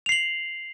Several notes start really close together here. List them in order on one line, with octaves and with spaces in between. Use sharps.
F7 C7 F#7